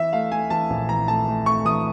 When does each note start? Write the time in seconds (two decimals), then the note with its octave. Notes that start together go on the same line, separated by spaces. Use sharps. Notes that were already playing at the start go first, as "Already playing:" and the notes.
Already playing: E3 E5
0.13 A3 F5
0.32 A3 G#5
0.50 E3 A5
0.70 A#1
0.89 E3 A#5
1.08 A3 A5
1.27 A3
1.46 A3 C#6
1.65 E3 D#6